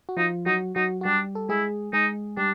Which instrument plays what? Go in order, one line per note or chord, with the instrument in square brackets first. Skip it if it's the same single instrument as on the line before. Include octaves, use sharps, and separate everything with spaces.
[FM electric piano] F#4
[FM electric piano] F3 F4 [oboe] D#4
[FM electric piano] F#3 F#4 [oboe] D#4
[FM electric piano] F#3 F#4 [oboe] D#4
[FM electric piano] F#4
[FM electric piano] G3 G4 [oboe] D4
[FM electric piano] A4
[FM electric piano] G#3 G#4 [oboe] E4
[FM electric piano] G#3 G#4 [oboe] D#4
[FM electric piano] G3 G4 [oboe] D4